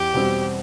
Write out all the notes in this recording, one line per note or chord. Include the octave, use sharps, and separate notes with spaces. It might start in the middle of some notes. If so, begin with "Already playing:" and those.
Already playing: E2 G4
B2 G3 C4